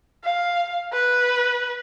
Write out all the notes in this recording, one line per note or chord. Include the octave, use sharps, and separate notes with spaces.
F5
B4